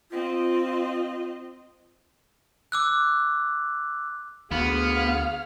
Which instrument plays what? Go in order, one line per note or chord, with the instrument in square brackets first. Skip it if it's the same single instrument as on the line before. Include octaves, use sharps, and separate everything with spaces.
[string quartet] C4 D#5 [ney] F4
[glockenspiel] D6 E6 F#6
[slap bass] D2 [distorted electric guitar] B3 [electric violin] G#4 F6 [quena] F5